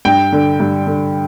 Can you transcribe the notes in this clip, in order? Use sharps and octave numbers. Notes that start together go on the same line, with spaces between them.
G2 G5
D3
G2
D3